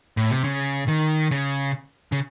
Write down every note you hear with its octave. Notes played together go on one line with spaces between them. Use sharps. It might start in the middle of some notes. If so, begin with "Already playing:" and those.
A2
C3
C#3
D#3
C#3
C#3